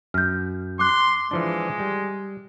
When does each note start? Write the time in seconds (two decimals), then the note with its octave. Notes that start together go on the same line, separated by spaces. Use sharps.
0.14 F#2 F6 G6
0.79 C6 D6 F#6
1.31 E3 F3 G#3 D4
1.80 G3